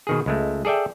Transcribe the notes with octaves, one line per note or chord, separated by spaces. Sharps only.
B2 D#3 G#4
C#2 G#3 A3
G#4 A4 D5 E5 G5